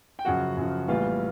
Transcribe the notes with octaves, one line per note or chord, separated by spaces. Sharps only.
G5
F#2 C#3 F3 F#4 F#5
F#2 C#3 F3
A#1 A2 E3 G3 B3 F4 F5